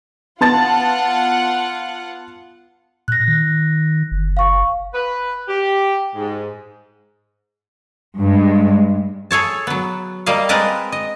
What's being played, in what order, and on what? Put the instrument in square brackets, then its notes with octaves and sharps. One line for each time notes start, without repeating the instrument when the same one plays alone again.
[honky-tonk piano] B3 A5 A6 [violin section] F4 F#5
[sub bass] A#2 [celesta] F#6 A#6
[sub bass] D#3
F#1
[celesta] F5 C#6
[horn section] B4
G4
G#2
[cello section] G2 G#3
[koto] G#4 A4 C#5 A5
F#3 B3
G3 A#3 D#5 F5
G#3 C4 A#4 B4 A5 A#5
D#5